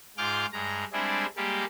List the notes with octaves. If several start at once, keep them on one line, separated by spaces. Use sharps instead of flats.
G#2 F4 G#4 D6 F6 G6
G2 G#3 A#5
G3 G#3 C4 D4 E4 G#4
G3 G#3 A#3 G4